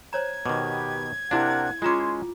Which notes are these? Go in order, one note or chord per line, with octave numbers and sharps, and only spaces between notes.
C5 C#5 A#5 G#6
B2 D#3 B3 G4 D6
C3 D4 E4 A#4 F5 F#5
G#3 C#4 F4 A#5 C6 D6